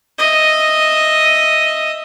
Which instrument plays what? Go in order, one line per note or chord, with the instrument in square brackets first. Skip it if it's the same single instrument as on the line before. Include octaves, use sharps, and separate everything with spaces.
[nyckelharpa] D#5 E5